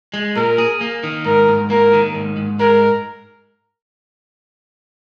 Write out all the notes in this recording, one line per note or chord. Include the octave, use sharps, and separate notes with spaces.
G#3
A#2 A#4
G#4
A#3
D#3
G#2 A#4
G#2
A#3 A#4
D#3
G#2
G#2
G#3 A#4